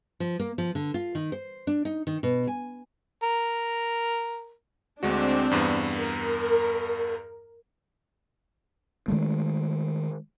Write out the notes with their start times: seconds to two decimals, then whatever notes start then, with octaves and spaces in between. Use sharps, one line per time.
0.20 F3
0.39 A#3
0.58 F3
0.75 D3
0.94 F4
1.15 D#3
1.32 C5
1.67 D4
1.85 D#4
2.07 D#3
2.23 B2
2.47 G#5
3.23 A#4
5.03 D2 G#3 C4 D4 F#4
5.51 E2 G2 B3
5.99 A#4
9.08 D#3 G#3 A3